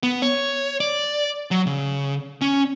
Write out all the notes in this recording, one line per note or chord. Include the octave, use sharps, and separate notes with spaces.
B3
C#5
D5
F#3
C#3
C#4